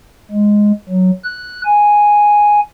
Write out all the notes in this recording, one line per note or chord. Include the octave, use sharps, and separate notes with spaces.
G#3
F#3
F#6
G#5